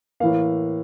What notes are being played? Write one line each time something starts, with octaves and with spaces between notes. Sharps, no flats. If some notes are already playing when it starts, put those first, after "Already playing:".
A2 E3 A#3 F5